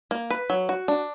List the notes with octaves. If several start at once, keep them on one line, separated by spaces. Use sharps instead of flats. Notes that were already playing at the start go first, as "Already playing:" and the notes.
A#3
B4
F#3
F#4
D4